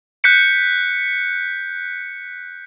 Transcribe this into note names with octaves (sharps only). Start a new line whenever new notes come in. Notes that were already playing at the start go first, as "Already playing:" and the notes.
F#6 G6 B6 C#7